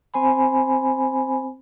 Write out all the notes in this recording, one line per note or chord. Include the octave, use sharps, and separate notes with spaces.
C4 C5 G#5 B5